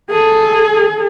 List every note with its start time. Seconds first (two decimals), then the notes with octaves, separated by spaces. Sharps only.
0.10 G#4 A4